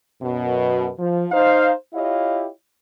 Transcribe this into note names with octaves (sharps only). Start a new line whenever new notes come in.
F#2 B2
F3
D#4 C5 F5
E4 F4 G4 C#5 D#5 F5